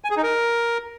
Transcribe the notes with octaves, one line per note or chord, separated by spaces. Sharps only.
G#5
G#4
D#4
A#4